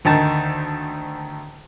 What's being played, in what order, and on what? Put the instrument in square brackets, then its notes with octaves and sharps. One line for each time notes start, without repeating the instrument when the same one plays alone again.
[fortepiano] D2 D#3 A5